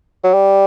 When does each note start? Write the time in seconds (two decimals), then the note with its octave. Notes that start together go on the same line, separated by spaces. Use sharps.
0.24 F#3
0.34 G3